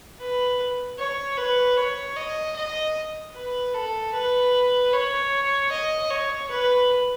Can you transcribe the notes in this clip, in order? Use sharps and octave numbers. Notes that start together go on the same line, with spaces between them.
B4
C#5
B4
C#5
D#5
D#5
B4
A4
B4
C#5
D#5
C#5
B4